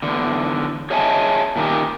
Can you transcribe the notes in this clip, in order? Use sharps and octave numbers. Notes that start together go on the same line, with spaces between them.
E2 D3
G#4 C#5 D#5 E5 G#5 A5
A#2 D#3 D4 G4